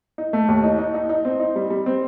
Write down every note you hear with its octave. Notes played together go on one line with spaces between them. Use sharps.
D#4
A3
D#2
D#4
D#4
D#4
D#4
C4
D#4
G3
G3
C4